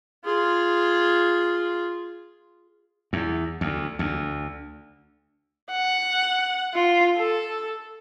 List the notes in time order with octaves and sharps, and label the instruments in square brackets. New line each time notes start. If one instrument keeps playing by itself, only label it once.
[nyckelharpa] F4 G#4
[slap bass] E2
D2
D2
[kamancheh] F#5
F4
A4